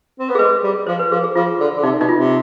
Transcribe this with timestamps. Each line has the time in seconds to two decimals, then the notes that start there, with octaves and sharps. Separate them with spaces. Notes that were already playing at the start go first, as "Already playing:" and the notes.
0.20 C4
0.29 B3
0.35 G#4
0.39 G#3 B4
0.63 G3
0.87 F3 C5
0.99 B4
1.11 F3 G#4
1.24 G#4
1.35 F3 F4
1.60 D3
1.77 D3
1.83 C3 D#4
2.00 B2 D#4
2.09 F4
2.17 C3